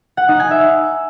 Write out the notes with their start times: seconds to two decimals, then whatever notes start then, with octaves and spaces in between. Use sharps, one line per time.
0.17 F#5
0.29 D#4
0.40 G#5
0.51 E5